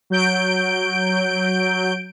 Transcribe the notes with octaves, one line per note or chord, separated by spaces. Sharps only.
F#3 G6 D7